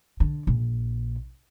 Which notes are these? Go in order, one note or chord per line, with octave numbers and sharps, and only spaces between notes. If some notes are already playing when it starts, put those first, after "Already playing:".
D3
A#1